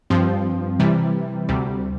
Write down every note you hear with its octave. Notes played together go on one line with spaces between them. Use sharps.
G2 F3 C4
C3 E3 G3
D2 C3 G3